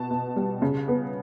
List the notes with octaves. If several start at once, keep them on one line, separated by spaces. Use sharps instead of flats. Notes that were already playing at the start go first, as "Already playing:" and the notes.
Already playing: B2 B3 A5
B2
G3
C#3
B3